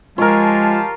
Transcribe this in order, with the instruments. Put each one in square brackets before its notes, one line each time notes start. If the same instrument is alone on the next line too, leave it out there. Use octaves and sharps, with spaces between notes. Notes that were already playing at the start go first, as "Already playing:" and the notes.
[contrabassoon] F3 [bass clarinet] G#3 [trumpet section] F4 G4 A5 [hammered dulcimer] A#4 C#5